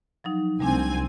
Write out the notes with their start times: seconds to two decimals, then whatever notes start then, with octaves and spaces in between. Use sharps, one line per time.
0.24 F3 F#3 D#4
0.60 C2 G3 A3 C4 D4 G#5